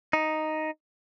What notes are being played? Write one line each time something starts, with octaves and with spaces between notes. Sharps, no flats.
D#4